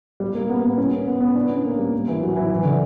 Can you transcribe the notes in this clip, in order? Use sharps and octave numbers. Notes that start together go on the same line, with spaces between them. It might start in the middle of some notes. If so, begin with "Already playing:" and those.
G3
A#3
B3
B3
C#4
B3
B3
D4
C#4
A#3
G3
E3
F#3
E3
E3
D3